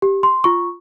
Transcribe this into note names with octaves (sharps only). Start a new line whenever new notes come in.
G4
C6
F4 C#6